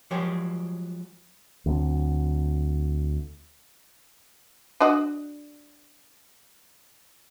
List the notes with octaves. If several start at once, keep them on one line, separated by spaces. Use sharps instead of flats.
F3 F#3 G#3 G4 G#4
D2 F#3 A#3 C4
D4 F#4 D#5